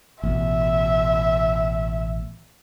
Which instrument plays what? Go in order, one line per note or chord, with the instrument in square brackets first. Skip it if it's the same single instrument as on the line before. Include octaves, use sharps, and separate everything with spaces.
[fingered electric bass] A1 B2 [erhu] E5